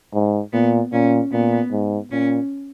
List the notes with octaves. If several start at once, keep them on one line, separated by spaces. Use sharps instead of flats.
G#2
A#2 B3
A#2 C#4
A#2 B3
G#2
A#2 C#4